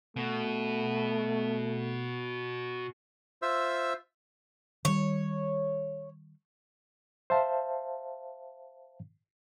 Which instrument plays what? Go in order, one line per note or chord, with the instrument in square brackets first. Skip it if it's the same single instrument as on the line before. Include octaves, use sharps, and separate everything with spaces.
[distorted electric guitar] B2 [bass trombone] A3
[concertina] F4 C5 E5 E6
[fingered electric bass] D#3 G3 [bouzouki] C#5
[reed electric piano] C5 E5 F5 A5